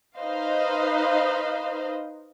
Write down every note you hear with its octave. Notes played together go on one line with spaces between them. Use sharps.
D#4 B4 C5 D#5 F5